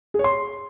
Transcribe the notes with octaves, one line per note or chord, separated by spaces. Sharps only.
G#4
C#5
C6